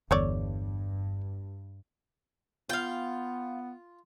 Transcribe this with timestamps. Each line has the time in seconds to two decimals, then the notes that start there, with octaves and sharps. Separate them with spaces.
0.11 G1 E2 G2 A3 C#5 D5
2.69 B3 F4 F5 G5